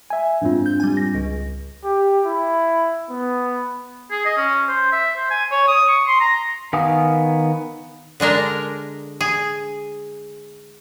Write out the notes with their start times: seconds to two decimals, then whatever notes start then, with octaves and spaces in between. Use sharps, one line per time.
0.10 E5 G#5
0.41 F2 G#2 C4 D4 F4
0.66 G6
0.80 G3 G#5
0.97 A#6
1.15 C#2
1.84 G4
2.26 E4
3.10 B3
4.11 G#4
4.25 D#5
4.37 C#4
4.69 C5
4.92 E5
5.16 C5
5.31 G#5
5.51 C#5
5.68 D#6
5.88 C#6
6.07 C6
6.20 A#5
6.73 D#3 B3 F5 G#5 D#6
8.20 D3 G#3 D4 A#4
9.21 G#4